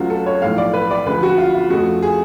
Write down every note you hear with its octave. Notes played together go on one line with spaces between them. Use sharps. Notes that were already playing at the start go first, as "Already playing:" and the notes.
Already playing: C#2 C#3 F#3 A3 F4 F#4
A4
C#5
B1 A2 F3 A3 F5
D5
B4
D5
D2 C#3 F3 G#3 B4
F#4
F4
F4
F2 C#3 F3 A3 F#4
G#4